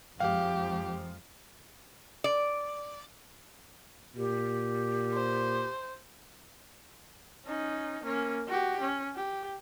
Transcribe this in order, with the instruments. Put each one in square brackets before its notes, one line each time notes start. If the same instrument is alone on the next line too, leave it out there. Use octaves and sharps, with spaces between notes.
[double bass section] F2 F3 G#3 [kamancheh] G4 [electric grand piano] F5
[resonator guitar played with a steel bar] D5
[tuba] A#2 [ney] G4
[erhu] C5
[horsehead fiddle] C#4 D#4
A#3 C#4
F#4 G4
C#4
G4